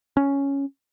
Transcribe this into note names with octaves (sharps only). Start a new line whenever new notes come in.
C#4